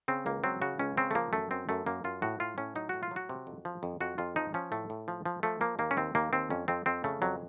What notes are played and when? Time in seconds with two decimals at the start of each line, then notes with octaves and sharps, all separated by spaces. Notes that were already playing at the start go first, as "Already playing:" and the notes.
0.08 C#3 C4
0.26 C#2 A#3
0.44 F#3 C4
0.61 C#3 F#4
0.79 C#2 C#4
0.97 C#3 C4
1.11 A3
1.15 F3 A#3
1.33 F#2 A3
1.51 F#2 C4
1.69 F#2 A3
1.86 F#2 A#3
2.04 F#2 F4
2.22 A2 F#4
2.40 A2 F4
2.58 A2 C#4
2.75 F#3 D#4
2.89 A2 F#4
3.03 F4
3.11 F#3
3.16 F#4
3.29 C3
3.47 F2
3.65 F3
3.83 F2
4.00 F2 F#4
4.18 F2 F4
4.36 F3 D#4
4.54 F3 C#4
4.72 A2 A3
4.90 A2
5.08 F3
5.26 F3
5.43 F3 A3
5.61 F3 A#3
5.79 D#2 A#3
5.91 C#4
5.97 D#2 C4
6.15 D#2 A#3
6.33 D#2 C4
6.50 F2 C#4
6.68 F2 C4
6.86 F2 C4
7.04 C#3 A3
7.22 F2 F#3